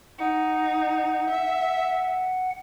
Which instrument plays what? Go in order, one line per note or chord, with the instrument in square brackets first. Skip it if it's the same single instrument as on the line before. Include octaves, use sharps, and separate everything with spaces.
[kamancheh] D#4 [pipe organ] F#5
[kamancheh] E5